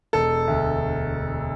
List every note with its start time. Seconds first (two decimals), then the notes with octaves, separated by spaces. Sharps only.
0.13 E1 A4
0.48 D2